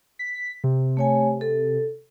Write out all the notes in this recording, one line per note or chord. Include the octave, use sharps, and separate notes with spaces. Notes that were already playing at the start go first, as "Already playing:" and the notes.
B6
C3
A3 C#5 G#5
A4